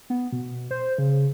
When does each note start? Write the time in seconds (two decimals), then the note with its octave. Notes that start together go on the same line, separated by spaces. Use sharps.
0.10 B3
0.32 B2
0.71 C5
0.98 C#3